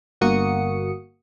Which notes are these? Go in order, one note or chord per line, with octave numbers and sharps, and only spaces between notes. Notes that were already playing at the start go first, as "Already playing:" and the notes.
G1 A#3 F#4 D#6 C#7